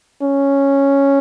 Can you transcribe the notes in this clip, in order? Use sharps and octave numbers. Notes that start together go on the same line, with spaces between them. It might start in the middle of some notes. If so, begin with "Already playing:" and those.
C#4